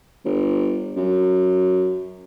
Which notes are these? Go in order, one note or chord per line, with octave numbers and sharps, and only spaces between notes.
G1
F#2